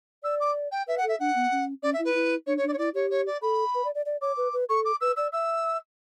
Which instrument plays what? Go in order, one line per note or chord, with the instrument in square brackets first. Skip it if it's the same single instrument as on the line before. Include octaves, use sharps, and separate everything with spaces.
[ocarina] D5 [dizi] E6
[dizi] D6
G5
[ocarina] B4 [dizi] E5
[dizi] F#5
[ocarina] A4
[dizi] E5
[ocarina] D4 [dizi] F#5
[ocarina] B3
C#4
[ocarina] C#4 [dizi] D5
[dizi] E5
[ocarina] E4
[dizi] B4
[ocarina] E4
[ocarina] D4 [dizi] C#5
[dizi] C#5
[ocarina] D4 [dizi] D5
[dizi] C#5
[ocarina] E4 [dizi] D5
[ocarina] G4 [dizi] C#5
[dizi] C#5
D5
[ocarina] A4 [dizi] B5
[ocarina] B4
D5
D5
D5
[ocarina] C#5 [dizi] D6
[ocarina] B4
B4
[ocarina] A4 [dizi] C#6
[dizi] D6
[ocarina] B4 [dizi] E6
[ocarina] D5 [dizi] E6
[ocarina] E5 [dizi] E6